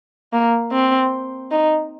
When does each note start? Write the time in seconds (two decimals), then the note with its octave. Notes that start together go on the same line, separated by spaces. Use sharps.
0.33 A#3
0.72 C4
1.51 D#4